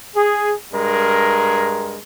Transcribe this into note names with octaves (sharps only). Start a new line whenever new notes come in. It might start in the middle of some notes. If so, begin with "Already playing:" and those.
G#4
G2 G#3 A#4